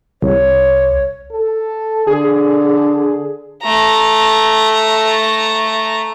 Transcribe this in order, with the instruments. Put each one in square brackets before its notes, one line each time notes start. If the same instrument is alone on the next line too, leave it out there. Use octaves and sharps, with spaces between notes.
[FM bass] C2 [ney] C#5
[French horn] A4
[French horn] D3 [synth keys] G#4
[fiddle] A3 A#5